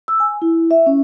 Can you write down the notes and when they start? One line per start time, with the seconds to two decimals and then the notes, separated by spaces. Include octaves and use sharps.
0.08 E6
0.20 G#5
0.42 E4
0.71 E5
0.86 C#4